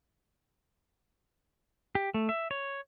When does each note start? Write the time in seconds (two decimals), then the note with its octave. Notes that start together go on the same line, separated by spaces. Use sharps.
1.95 G4
2.14 A3
2.29 E5
2.51 C#5